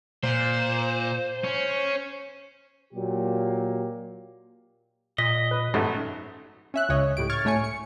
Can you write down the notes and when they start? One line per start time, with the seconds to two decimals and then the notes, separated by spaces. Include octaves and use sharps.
0.24 A#2 C5
1.44 C#4
2.94 A#2 F#3 A#3 G4
5.18 A#2 D#5 B6
5.51 B4
5.74 G#1 F#2 A3
6.74 C#4 E5 F#6
6.89 C#2 C#3 C#5 D#5
7.17 A2 G4 D7
7.30 C#6 F6 G#6 A6
7.45 A2 A3 C#5 G#5 C#7
7.64 C#7